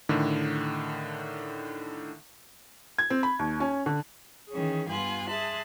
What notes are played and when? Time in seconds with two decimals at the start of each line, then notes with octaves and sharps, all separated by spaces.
0.09 A2 D3 D#3
2.98 G#6
3.10 C4
3.23 B5
3.39 D#2
3.60 C#4
3.86 D3
4.50 D#3 E3 C#4 G#4
4.88 G2 B3 F4 G#5 C6 F#6
5.27 G#4 E5 A5 C6 F#6